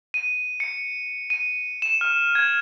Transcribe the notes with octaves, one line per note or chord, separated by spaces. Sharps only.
D#7
C#7
D#7
E7
F6
G#6